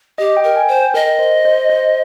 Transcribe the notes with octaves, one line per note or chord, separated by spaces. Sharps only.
G4 D#5
G5
A#4
G#5
C5
G5
A#4 D#5
C5
C5
C5